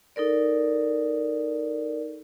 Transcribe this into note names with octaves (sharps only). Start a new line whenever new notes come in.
D#4 A4 A#4 D5